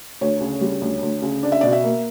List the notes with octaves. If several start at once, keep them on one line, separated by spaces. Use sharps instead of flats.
D2 C#5
C#3
G3
D2
D2
C#3
D4 D5
E5
B2 D5
E5
A#3